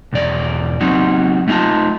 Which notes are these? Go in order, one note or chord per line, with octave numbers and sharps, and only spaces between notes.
B1 E2 D5
F#3 C4 D#4 F#4
A3 C#4 D#4 F4 A5